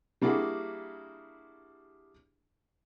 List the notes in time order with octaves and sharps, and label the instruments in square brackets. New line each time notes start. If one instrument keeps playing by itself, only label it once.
[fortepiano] G3 A#3 D4 E4 F#4 G#4